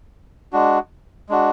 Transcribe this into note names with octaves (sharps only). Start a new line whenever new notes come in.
G#3 D4 F#4
G#3 D4 F#4